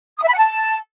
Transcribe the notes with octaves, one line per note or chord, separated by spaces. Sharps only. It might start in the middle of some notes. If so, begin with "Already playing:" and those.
D#6
E5
B5
F#5
A5